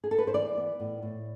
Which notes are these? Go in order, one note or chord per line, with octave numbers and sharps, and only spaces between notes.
G#4
A4
B4
C5
E3 D5
B3
A2
A2